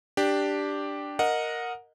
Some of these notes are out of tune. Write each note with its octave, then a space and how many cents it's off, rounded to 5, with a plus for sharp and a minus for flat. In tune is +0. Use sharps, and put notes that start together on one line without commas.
D4 +0 G4 +0
A#4 +0 D#5 +0 F#5 -20